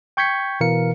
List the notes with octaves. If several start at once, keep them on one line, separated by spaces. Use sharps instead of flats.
G5 C#6 G6 G#6 B6 C#7
B2 E3 A#4 F5 C#7